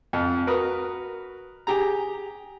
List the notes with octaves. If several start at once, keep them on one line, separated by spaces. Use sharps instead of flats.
F2
F#4 A#4 B4 D#6
G4 G#4 A#5